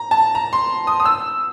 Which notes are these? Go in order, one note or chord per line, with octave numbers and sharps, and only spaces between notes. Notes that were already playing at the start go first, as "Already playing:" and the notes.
Already playing: A#5
A5
A#5
C6
D#6
D#6
E6